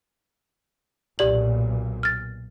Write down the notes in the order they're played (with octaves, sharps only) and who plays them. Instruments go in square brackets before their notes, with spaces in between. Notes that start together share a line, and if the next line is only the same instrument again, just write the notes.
[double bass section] B1 A#2 [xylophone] G4 D5 F#7
[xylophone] F6 A6